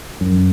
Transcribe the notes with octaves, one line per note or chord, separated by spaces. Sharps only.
F#2